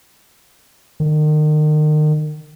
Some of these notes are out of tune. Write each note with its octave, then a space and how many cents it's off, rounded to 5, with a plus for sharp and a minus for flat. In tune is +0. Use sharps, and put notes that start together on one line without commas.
D#3 -35